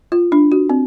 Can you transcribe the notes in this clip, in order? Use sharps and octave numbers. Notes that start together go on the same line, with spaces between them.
F4
D4
F#4
C4